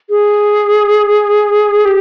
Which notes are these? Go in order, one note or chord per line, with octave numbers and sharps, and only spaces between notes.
G#4
G4